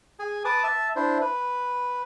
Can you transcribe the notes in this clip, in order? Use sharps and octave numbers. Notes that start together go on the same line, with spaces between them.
G#4 G#5
B4 A5 D6 D#6
E5 A5
D4 E4 C5
B4